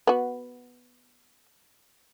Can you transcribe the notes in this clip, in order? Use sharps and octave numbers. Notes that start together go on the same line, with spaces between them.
B3 F#4